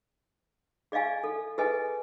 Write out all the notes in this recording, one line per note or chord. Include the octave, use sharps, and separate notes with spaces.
G#4 D5 D#5 F5 G#5
A4
G#4 A4 B4 D#5 G#5